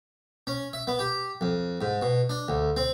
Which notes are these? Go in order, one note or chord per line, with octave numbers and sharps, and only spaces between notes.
C#4
E5
B3
G4
F2
G#2
B2
D4
D2
C4